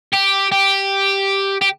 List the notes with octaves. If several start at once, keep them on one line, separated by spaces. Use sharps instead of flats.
G4
G4
G4